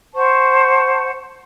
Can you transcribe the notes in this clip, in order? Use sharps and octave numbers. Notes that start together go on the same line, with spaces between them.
C5 F#5 A5 C#6